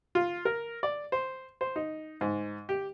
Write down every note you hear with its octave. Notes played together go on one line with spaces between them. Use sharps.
F4
A#4
D5
C5
C5
D#4
G#2
G4